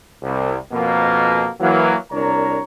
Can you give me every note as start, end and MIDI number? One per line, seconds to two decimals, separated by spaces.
0.23 0.57 36
0.72 1.49 41
0.72 1.49 47
0.72 1.49 58
1.60 1.95 52
1.60 1.95 54
1.60 1.95 58
2.11 2.61 36
2.11 2.61 62
2.11 2.61 70
2.11 2.61 73
2.11 2.61 82